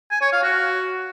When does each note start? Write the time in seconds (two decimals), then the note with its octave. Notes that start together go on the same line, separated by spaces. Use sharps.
0.11 G#5
0.22 C#5
0.32 F5
0.43 F#4